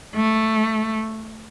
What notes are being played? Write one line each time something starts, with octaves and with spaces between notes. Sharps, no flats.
A3